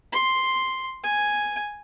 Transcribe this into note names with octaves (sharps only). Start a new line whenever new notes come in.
C6
G#5